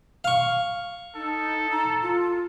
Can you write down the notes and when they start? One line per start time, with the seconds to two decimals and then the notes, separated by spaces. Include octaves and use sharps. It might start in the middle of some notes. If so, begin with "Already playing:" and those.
0.24 F5 C#6
1.16 D#4 A4
1.71 A#5
2.02 F4